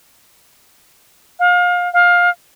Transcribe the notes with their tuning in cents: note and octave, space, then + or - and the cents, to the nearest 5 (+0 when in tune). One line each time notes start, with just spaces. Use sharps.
F5 +30
F5 +20